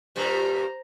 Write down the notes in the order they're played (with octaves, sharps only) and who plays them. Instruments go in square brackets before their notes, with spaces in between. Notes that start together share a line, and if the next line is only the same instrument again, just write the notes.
[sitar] G2 A#2 G3 [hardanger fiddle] C5 A#5